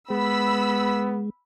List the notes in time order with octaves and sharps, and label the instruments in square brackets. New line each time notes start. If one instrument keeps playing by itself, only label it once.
[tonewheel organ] G#3 [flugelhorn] B3 [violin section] B5 E6 B6